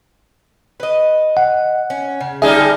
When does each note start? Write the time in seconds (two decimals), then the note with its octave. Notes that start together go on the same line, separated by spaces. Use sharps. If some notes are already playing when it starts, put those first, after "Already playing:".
0.80 B4 D#5
1.37 F#5
1.90 C#4
2.20 C#3
2.42 D3 G3 D#4 G#4 E5 A5